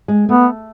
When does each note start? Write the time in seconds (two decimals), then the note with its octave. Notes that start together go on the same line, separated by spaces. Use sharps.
0.08 G#3
0.28 A3 B3